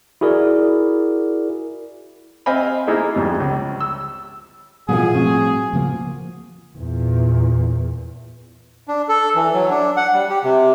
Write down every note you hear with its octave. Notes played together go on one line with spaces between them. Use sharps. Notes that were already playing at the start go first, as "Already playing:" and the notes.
E4 F#4 G#4 A#4 D5
C4 C5 D#5 F5 G#5 B5
A#3 D#4 E4 G#4 A4 D#5
F2 G#2 F3 G3
C#2
E6
B2 E3 F3 G3 G#4
A2 F3 C4 F#4
C#3 F3 A#3
E2 A#2
D4
A4
E3
F#3
D4
F#5
G3
G4
C3